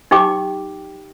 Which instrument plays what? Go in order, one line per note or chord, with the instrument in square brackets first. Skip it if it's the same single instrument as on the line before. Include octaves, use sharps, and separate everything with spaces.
[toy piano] D#4 G4 G5 D6